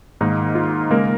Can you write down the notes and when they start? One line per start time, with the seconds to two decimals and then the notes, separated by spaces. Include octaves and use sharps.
0.21 G#2 D#3 A#3 D#4
0.55 F4
0.91 C#3 G#3 A#3 A#4